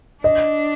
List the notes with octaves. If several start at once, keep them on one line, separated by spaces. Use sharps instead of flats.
D4 D#5